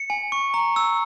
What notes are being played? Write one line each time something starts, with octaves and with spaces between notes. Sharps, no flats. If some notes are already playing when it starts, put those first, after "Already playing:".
Already playing: C#7
G#5
C#6
A#5
E6